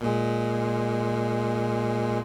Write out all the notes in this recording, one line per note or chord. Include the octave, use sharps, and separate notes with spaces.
A#2 G#3